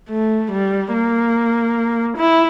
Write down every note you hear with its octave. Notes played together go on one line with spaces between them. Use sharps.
A3
G3
A#3
E4